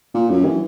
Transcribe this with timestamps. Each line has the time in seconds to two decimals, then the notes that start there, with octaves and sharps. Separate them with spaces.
0.14 A#2
0.30 F#2
0.45 E3